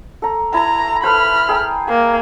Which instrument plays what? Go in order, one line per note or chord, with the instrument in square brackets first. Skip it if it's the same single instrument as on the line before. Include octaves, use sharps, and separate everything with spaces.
[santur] A4 A#5
[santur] E4 [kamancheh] A#5
[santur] A4 B4 C5 [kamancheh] B5 F6
[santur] G#4 G5 A#5
[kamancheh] A#3